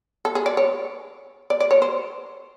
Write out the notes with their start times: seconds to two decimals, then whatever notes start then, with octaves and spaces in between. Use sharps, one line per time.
0.25 A4
0.35 G#4
0.46 D5
0.57 C#5
1.50 D5
1.60 D5
1.71 C#5
1.82 C5